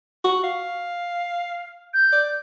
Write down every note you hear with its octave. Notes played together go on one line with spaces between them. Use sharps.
F#4
F5
G6
D5